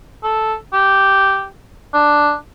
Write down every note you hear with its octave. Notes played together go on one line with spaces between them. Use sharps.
A4
G4
D4